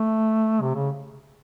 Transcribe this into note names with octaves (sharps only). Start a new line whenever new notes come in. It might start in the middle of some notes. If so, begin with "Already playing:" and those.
Already playing: A3
C3
C#3